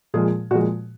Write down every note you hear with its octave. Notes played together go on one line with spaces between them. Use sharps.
A#2 F3 G#3 G#4
A#2 F3 G#3 F#4